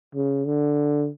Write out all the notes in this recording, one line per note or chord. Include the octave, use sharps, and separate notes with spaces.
C#3
D3